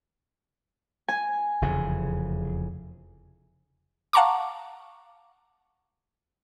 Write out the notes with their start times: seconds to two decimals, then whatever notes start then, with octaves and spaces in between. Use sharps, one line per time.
1.08 G#5
1.62 F1 E2 C#3
4.13 F5 F#5 A5 A#5 C#6 D6